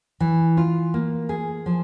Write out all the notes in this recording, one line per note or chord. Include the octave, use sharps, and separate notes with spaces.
E3
F4
A#3
G#4
F3